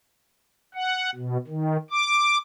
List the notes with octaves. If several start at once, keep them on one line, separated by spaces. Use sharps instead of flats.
F#5
B2
D#3
D6